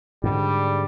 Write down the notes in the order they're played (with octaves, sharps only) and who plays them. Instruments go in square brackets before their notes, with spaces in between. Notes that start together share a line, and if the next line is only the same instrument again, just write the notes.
[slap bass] G#2 D3 [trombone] G3